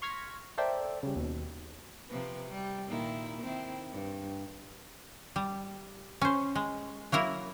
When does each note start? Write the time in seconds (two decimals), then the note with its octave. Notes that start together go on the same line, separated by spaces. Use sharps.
0.02 C6 C#6 F6 G#6 A#6 B6
0.58 A4 A#4 C5 D5 E5 G5
1.03 C#3 G3
1.16 D#2 B2
2.08 C3 F3 B4
2.49 G3
2.88 A#2 D#3 E4
3.42 D#3 C4 E4
3.92 G2
5.36 G3
6.21 C#4 C5
6.55 G#3
7.12 F#3 A#3 E4 A#4